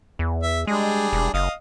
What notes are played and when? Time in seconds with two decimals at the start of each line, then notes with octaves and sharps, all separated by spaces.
0.19 E2
0.43 E5
0.67 G3 G#3 D4 G#4
1.13 E1
1.34 F#1 D#5 F5